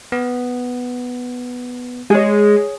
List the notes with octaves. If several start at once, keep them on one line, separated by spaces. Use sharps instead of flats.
B3
G#3 G#4 C#5